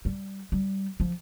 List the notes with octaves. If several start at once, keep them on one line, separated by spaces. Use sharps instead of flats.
G3
G3
F3